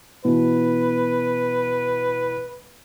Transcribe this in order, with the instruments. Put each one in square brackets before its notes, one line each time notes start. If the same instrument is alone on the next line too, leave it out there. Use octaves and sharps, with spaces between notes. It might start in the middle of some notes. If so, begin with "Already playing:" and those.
[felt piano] B2 E3 [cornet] B4